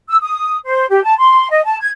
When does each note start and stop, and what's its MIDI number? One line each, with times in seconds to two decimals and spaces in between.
0.09 0.16 88
0.21 0.57 87
0.65 0.85 72
0.90 1.03 67
1.03 1.18 81
1.18 1.50 84
1.50 1.63 75
1.64 1.76 81
1.81 1.89 92